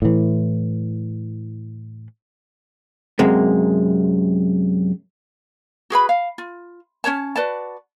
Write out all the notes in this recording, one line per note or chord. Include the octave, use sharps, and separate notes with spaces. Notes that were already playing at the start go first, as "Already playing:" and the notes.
A2 E3
F#2 C3 G#3 A#3
F#4 G#4 B4 B5
F5
F4
C#4 C5 C#5 A5
F#4 B4 D5 A5